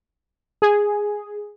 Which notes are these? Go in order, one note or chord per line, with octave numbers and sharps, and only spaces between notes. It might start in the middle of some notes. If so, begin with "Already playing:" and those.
G#4